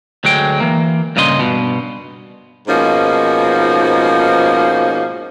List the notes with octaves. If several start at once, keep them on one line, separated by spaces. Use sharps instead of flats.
D2 F#3 G#3 G5
E3 A#3
G2 A#2 C#3 D#5 B5 C6
G2 B2
G#2 B2 F3 A#3 C#4 D#4